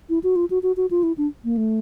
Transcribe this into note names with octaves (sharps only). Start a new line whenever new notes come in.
E4
F#4
F4
F#4
F#4
F#4
F4
E4
D4
A#3
A3